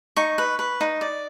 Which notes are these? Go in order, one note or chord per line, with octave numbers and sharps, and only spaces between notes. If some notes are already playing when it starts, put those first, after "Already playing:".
D#4 C#6
B4
B4
D#4
D5